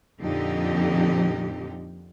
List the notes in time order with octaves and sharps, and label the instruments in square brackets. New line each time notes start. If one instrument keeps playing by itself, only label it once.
[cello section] F2 A#2 D3 F3 D#4 G4